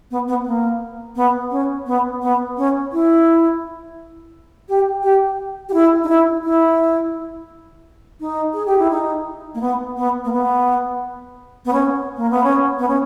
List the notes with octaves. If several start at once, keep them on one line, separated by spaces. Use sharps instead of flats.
B3
B3
A#3
B3
C#4
B3
B3
C#4
E4
G4
G4
G4
E4
D#4
E4
E4
D#4
G#4
G4
E4
D#4
A#3
B3
B3
A#3
B3
B3
C#4
A#3
B3
C#4
B3
C#4